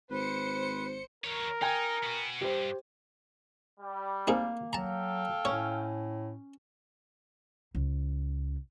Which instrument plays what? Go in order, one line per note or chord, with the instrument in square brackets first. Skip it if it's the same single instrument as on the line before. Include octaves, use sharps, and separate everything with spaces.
[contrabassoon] G#1 [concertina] B4 [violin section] C5 C#7
[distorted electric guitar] E2 C#5 [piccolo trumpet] A#4
[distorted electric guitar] D#4 [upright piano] G5 G#5 G#6
[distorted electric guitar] B3 F#4
[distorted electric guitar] C#2 G2 [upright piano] G4 C5
[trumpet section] G3
[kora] A#3 [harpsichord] C4 D#4 G#4
[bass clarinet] F#3 [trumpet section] A4 F5 G5 [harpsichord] A5 A#5
[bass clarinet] A2 [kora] C#4 [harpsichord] C#5
[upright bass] C#2